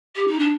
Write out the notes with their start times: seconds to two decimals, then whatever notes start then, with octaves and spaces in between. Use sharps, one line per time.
0.15 G4
0.27 D#4
0.39 D4